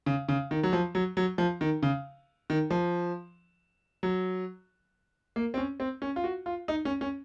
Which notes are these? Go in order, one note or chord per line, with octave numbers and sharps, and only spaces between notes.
C#3
C#3
D#3
F#3
F3
F#3
F#3
F3
D#3
C#3
D#3
F3
F#3
A#3
C4
C#4
C4
C#4
F4
F#4
F4
D#4
C#4
C#4